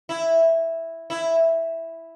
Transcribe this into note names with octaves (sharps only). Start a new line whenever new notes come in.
E4
E4